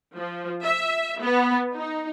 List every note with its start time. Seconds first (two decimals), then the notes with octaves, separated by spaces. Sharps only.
0.16 F3
0.63 E5
1.21 B3
1.75 D#4